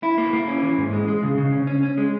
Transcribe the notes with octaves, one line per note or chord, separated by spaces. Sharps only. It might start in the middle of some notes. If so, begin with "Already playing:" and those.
E4
A#3
A#3
C#4
E3
G#2
G#3
G#3
C#3
C#3
C#4
C#4
C#4
G#3